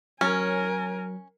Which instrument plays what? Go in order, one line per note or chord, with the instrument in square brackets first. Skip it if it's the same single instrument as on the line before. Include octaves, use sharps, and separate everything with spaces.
[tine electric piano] F#3 [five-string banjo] C#4 [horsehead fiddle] A#4 G#5